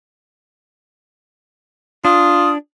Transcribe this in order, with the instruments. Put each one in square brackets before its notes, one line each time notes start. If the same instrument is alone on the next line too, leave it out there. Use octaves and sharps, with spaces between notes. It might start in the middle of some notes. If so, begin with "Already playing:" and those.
[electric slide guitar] D4 [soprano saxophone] F4 [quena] D#6